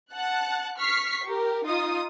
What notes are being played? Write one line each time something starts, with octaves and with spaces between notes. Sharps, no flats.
F#5 A5 F#6
C#6 F6 B6 C7
G4 A#4
D#4 F4 D#6